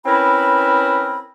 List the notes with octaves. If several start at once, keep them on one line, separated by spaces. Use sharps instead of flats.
C4 C#4 E4 A#4 B4 B5